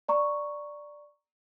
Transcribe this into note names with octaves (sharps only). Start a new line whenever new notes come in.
D5 A#5 C#6